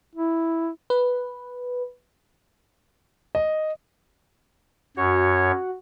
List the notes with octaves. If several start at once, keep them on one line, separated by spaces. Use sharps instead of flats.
E4
B4
D#5
F#2 F#4 C#5